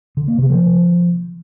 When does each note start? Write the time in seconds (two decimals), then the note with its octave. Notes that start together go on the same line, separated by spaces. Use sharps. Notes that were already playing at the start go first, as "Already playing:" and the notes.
0.17 D3
0.28 A#3
0.38 C3
0.49 F3